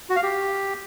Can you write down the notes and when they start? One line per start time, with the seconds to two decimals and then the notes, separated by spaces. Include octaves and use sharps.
0.10 F#4
0.16 F5
0.23 G4